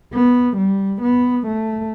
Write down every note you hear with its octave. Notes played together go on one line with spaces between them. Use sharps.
B3
G3
B3
A3